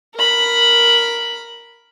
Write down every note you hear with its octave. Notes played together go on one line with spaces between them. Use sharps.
A#4 B5